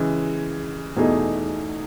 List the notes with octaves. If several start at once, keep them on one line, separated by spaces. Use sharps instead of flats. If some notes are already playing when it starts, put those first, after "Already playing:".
Already playing: C#3 E3 G#3
E2 B2 A3 D#4 G#4